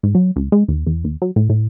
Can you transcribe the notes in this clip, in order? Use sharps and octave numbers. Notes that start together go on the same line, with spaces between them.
G#2
F#3
C#2
G#3
D#2
E2
D#2
F#3
A2
A2